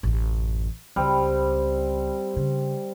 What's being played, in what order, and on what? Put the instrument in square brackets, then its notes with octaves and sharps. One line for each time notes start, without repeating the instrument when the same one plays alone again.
[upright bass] A1 F#2
[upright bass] C#2 [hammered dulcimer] G3 C4
[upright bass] C#3